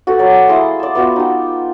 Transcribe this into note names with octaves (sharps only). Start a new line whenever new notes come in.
F#4 A4 B4
F#3 D5
A#3 E4 G#4 C6
D5 A5
B3 F4 F#4 D5
D#4 G4